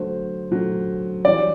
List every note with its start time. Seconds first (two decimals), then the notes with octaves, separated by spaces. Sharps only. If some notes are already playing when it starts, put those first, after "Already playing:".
Already playing: D3 F#3 A3 C5
0.51 D3 F#3 A3
1.25 E3 G3 D4 F#4 D5